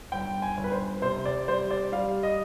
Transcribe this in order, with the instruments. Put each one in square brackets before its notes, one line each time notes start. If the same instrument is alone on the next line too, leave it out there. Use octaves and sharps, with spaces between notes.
[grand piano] G1 G5
G#5
G1
B4
C5
C3 C5
D5
G3 C5
D5
G3 F5
D#5